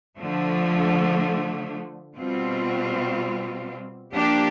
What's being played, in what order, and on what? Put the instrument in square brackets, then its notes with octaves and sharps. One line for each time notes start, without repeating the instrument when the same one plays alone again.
[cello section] D3 F3 A3
B2 G3 C4 F4
F3 A#3 D4 G4